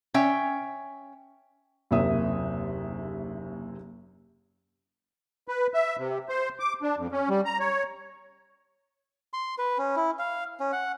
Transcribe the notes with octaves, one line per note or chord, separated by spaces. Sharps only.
C#4 E5 G5
F#1 D#2 C3 A#3 E5 D#6
B4
E5
C3
C5
D6
D4
F2
C#4
G3
A#5
C#5
C6
B4
C#4
E4
F5
C#4
F#5